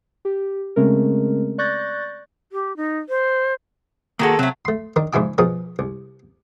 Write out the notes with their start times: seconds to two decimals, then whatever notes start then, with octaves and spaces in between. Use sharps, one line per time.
0.25 G4
0.76 C#3 G#3 A3 C4 C#4 A#4
1.58 D5 C#6 F#6 G6 A6 A#6
2.52 G4
2.77 D#4
3.09 C5
4.19 D#3 G#3 A#3 F#4 A4 F#5
4.39 C3 F#3 A3 C4
4.65 A3 C6
4.96 D#3 D4 A#4
5.13 A#1 G#2 C#3 E4 G#5 D6
5.38 B2 F3 G#4 A#4 C#5
5.79 C2